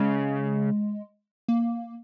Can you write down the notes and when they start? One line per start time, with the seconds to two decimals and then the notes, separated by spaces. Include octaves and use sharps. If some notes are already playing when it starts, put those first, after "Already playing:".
Already playing: C#3 G#3
1.48 A#3